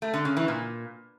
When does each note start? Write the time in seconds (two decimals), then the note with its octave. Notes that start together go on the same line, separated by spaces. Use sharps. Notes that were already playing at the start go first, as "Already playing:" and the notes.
0.02 A3
0.14 D3
0.25 C#3
0.37 E3
0.48 A#2